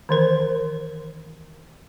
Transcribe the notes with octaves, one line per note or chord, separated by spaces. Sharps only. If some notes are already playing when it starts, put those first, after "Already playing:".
D#3 E3 A#4 C5